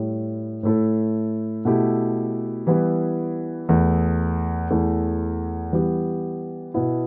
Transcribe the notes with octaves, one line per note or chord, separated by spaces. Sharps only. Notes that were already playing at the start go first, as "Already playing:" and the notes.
Already playing: A2 G3 E4
A2 A3 E4 A4
B2 A3 E4 G4
E3 G3 B3 E4
E2 E3 A3
E2 E3 A3
E3 G3 B3 G4
B2 B3 E4